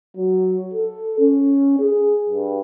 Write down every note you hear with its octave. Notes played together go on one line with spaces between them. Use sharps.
F#3
A4
C#4
G#4
G2